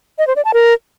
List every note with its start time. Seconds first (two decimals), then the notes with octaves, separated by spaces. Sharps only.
0.18 D#5
0.27 C5
0.36 D5
0.45 A5
0.54 A#4